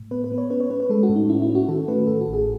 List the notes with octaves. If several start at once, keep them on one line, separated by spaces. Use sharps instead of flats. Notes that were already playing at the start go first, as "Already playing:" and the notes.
Already playing: A2
B3 B4
B4
B3
C#5
C#4 B4
C#5
C#4 B4
B4
G#3 A4
F#4
A2
D#4
C#4 E4
E4
C#4
F#4
D#3 A4
A3 B4
A2 A4
F#4
A1
G#4